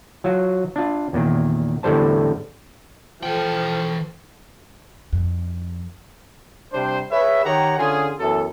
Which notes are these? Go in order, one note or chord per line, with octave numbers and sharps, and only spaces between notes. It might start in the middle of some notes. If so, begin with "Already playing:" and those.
F#3 F4 F#4
D4 F4
E2 A#2 D#3
E2 A2 D3 G3 C5 A5
E3 F3 A4 G5
F2
C3 G3 D4 C5
G#4 B4 C#5 E5
D#3 D#4 G4 C#5 F#5 A#5
D3 C#4 F4 G#4
F#2 E3 F#3 B3 A4